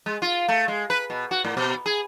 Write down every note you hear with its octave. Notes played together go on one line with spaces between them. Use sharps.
G#3
F4
A3
G#3
B4
B2
F#4
A2
B2
G#4